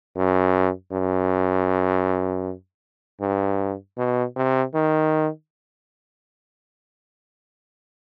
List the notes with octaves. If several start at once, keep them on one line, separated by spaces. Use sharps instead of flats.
F#2
F#2
G2
B2
C3
D#3